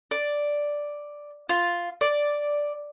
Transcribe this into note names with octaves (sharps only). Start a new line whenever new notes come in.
D5
F4
D5